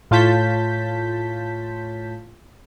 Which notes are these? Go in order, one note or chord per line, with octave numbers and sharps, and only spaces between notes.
A2 F4 C#5 A5 G6 B6